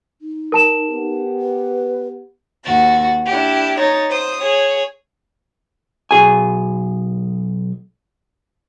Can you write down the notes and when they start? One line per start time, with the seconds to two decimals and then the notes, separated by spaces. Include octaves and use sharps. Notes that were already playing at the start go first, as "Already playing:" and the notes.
0.21 D#4
0.52 A#4 A5 E7
0.90 B3 G4
1.40 B4
2.64 D#2 F#4 A6
3.27 D4 E4 G4
3.79 D#4 C#5 A6
4.10 C5 D#6
4.42 G#4 C#5
6.11 B1 G#4 G#5